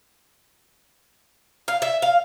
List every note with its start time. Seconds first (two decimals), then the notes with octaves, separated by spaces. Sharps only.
1.68 F5
1.82 E5
2.02 F5